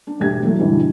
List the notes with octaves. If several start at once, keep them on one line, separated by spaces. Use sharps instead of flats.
D4
E1 A3 G4 G#6
E3 F#3 A3
G2 B2 D3 E3 G3